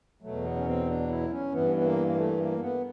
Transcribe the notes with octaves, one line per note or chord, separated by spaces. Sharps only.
E2 B2 F#3 A3
B3
C#4
C4
D4
E4
C#4
G2 E3 B3
B3
A#3
A#3
A3
A#3
B3